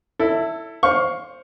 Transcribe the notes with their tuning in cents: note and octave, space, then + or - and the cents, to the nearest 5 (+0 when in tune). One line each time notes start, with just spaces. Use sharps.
E4 +0 A4 +20
C5 +0 F5 +15 C#6 +0